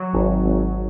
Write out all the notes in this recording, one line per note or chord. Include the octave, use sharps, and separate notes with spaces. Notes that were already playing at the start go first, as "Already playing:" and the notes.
Already playing: F#3
G#1
G#1